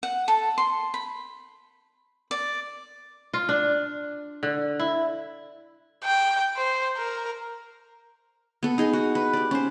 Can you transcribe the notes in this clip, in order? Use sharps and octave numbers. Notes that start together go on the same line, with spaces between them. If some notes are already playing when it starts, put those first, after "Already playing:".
F#5
A4
C6
B5
D5
F4
D4
D3
E4
G5
C5
A#4
B3 A4
D#4 G#4 D#5
F#4
B4
G4 D5
C#4 C5